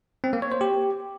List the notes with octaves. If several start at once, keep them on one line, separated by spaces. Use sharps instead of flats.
C4
A#3
C#5
C5
G4